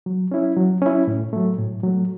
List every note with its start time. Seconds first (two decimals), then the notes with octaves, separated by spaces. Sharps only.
0.06 F#3
0.31 C#4 E4
0.57 F#3
0.82 C#4 E4
1.08 A2
1.33 F#3 A3
1.59 A2
1.83 F#3 A3